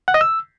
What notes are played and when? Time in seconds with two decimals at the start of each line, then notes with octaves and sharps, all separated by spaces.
0.08 F#5
0.14 D#5
0.21 E6